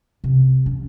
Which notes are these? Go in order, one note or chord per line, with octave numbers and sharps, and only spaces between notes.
C3
F3 C#4